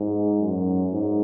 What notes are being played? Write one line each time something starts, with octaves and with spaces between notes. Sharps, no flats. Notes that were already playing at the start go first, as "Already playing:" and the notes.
Already playing: G#2
F#2
G#2